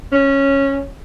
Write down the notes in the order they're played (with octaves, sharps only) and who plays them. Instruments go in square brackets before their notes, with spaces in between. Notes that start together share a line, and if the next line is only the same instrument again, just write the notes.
[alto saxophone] C#4